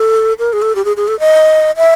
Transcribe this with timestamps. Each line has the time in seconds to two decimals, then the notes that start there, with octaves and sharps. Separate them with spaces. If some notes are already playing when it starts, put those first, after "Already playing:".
Already playing: A4
0.39 A#4
0.53 G#4
0.62 A4
0.75 G4
0.85 G#4
0.96 G#4
1.08 A4
1.20 D#5
1.77 E5